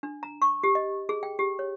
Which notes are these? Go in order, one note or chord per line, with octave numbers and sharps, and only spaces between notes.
D4
A#5
C#6
G4
D#5
G#4
G5
G4
C#5